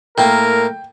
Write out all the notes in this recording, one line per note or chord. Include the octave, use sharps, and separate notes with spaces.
A2 A#3 A#4 G5